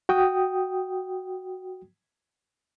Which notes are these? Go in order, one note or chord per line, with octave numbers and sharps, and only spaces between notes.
F#4 G5 D#6